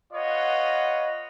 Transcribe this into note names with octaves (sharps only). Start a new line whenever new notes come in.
F4 B4 C#5 D#5 F#5